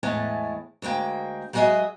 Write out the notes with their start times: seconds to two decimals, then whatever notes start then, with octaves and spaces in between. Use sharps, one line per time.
0.03 E2 A2 G#3 A3 G#5 A5
0.82 D2 G#3 A#3 G5
1.53 F#3 G#3 F#4 G#4 D#5 E5